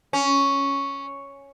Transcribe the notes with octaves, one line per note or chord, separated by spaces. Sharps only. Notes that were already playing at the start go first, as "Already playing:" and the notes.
C#4